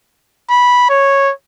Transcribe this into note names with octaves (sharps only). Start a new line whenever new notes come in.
B5
C#5